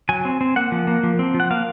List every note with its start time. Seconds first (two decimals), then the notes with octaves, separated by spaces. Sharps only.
0.09 F#3 G#5
0.25 C4
0.41 C4
0.56 A#3 F#5
0.72 F3
0.87 A#3
1.03 F3
1.19 C4
1.34 F3
1.40 F#5
1.51 A#3 F5